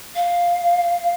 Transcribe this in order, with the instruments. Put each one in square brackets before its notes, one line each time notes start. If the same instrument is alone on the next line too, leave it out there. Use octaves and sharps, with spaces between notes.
[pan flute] F5